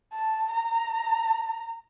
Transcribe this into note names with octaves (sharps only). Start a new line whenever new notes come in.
A5
A#5